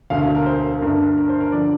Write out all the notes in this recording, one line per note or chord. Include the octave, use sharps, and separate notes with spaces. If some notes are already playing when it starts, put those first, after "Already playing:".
E1 D2 D3 F5
F5
A#4
C5
G2 D3 A3 D4 A#4
A#4
A#4
C5
A#4
D3 F3 D5